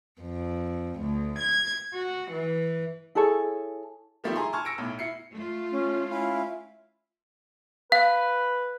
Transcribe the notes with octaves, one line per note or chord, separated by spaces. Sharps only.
F2
D2
G#6
F#4
E3
E4 G#4 A4 C#5
D#3 F3 G3 A3 C4
E4 G#4 G#5 A#5 C6
G#5 A5 C#6 F6 G#6
E6 A#6 C#7 D7
B1 A2
E4 C7 C#7
A3 F4
C#4
C#4 E4 E5 F5
B4 F5